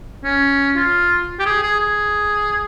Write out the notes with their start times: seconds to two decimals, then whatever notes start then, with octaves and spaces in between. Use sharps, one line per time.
0.24 C#4
0.76 F4
1.40 G4
1.46 G#4
1.63 G#4
1.80 G#4